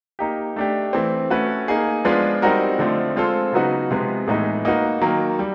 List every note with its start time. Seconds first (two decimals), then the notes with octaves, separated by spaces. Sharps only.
0.19 A#3 D#4 G4
0.56 A3 D4 G4
0.93 E3 A3 C4
1.30 A3 C#4 F#4 B4
1.68 A#3 D#4 G#4
2.05 F3 G#3 B3 D4 F4
2.42 G3 C4 D#4 F#4 A#4
2.79 D3 F3 A3 C4
3.16 G#3 C4 F4 A4 C5
3.53 C#3 F#3 B3 D#4 F#4
3.91 C3 F3 G#3 B3
4.28 A2 E3 G#3 B3 D#4
4.65 A#3 D#4 F#4 B4
5.01 D#3 F#3 A#3
5.39 G3